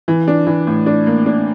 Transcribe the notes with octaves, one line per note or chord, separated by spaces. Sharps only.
E3
D4
E3
A2
D4
A#3
D4